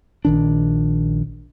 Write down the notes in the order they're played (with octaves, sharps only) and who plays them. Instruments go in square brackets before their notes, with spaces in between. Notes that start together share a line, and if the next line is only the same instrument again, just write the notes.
[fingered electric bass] A#1 D#3 D4